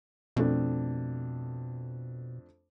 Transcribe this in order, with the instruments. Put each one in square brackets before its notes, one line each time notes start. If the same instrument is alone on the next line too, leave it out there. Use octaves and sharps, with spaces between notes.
[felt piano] F2 A3 D4 [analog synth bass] B2